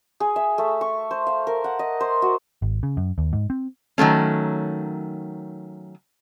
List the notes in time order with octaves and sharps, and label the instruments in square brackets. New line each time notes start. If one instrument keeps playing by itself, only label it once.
[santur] G#4
E5
A3
C#6
C5
F5
A#4
F#5
D#5
C5
F#4
[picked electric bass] G#1
C#3
F#2
D#2
G#2
C4
[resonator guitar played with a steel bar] D#3 F#3 A3 C#4